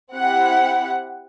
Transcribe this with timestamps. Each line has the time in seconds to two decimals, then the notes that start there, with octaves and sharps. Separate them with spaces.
0.13 C4 E4 G4 F#5